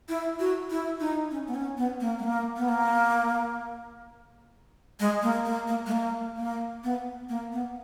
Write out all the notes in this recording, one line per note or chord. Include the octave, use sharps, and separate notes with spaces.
E4
F#4
E4
D#4
C#4
B3
C#4
B3
A#3
G#3
A#3
B3
A#3
G#3
A#3
A#3
A#3
G#3
A#3
A#3
B3
A#3
B3